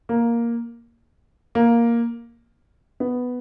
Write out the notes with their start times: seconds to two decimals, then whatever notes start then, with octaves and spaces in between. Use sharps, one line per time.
0.09 A#3
1.55 A#3
3.00 B3